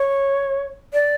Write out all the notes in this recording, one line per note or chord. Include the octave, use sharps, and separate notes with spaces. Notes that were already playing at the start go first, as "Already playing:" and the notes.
Already playing: C#5
D5